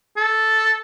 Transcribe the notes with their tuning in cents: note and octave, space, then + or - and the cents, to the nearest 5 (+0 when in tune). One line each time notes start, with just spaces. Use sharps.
A4 -5